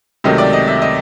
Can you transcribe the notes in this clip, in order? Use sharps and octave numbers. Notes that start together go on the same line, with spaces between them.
C#2 C3 D#3 F#3 A3 D#5
D5
D#5
E5
D#5